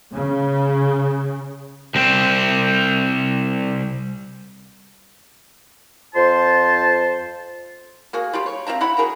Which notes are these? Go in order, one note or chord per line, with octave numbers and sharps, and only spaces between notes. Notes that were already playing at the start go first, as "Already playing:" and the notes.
C#3
C2 C4
F2 F4 C5 A5 C6
A#3 F#4 G#4
G3 F4 G4
C#5
C4 F4 E5 A#5
E4 F#5 B5
F#3 G#4 A#4 A#5